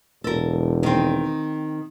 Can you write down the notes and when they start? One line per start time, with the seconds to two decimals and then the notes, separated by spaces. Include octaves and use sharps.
0.24 E1 A4 A#4
0.83 D#3 C4